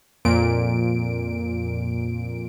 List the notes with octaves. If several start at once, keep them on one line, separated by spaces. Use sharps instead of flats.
F2 A#2 D7